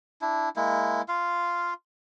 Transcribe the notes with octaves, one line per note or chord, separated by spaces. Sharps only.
D4 E4
G#3 A#3 E4
F4 F5